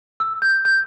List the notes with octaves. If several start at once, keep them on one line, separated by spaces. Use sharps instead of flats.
E6
G6
G6